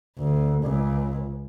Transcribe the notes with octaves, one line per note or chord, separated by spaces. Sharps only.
D2
C#2